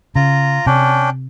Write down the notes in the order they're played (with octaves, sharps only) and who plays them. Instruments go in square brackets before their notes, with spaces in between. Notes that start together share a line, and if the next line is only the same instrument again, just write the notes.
[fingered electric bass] C#3 [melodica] F4 A#5
[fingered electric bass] C3 [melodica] C#4 D4 G5